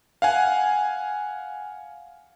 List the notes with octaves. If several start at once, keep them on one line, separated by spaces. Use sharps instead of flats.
F5 F#5 G#5